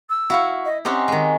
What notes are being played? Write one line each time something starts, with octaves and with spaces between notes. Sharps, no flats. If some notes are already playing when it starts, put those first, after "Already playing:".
E6
E4 F#4 F5 C#6
D#5
C4 C#4 D#4 G4 D#5 F#5 C6
D#3 G#3